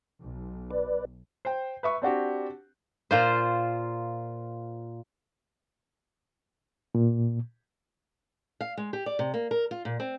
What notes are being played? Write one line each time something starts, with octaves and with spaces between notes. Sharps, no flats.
B1
B4 D5
C5 G5
B4 E5 C#6
C4 D4 F#4 G4
A#2 F4 C5
A#2
F5
G#3
G4
D5
C3
A#3
A#4
F4
A#2
C4